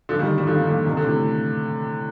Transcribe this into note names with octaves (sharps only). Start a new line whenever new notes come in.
D3 F3
D#3 G3
D#3 G3
D3 F3
D#3
A#2 D3
C3 D#3
D3
A2 C3